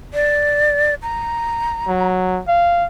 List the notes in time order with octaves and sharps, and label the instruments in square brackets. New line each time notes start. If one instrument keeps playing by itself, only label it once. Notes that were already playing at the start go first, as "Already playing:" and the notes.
[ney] D5
A#5
[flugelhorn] F#3
F5